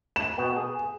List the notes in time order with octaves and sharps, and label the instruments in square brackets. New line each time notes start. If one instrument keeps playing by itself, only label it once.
[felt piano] E7
[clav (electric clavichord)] B2 B3 G5
G#4